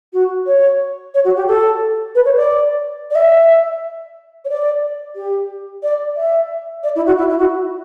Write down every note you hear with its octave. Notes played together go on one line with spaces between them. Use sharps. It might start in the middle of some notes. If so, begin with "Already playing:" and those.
F#4
C#5
C#5
F#4
G4
A4
B4
C#5
D5
D5
E5
C#5
D5
G4
D5
E5
D5
E4
F#4
E4
E4
F#4